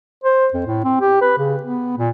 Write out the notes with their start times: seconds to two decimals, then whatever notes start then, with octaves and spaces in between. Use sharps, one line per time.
0.24 C5
0.54 F2
0.66 A2
0.84 C4
1.01 G4
1.21 B4
1.38 C#3
1.63 B3
1.98 A#2